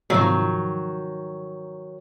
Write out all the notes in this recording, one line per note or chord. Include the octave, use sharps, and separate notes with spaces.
G#2 C3 D#3 F3 F#3